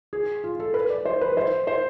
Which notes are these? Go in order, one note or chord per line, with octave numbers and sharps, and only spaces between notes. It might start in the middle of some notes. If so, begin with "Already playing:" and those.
G#4
F4
A4
B4
D5
C5
B4
C5
C5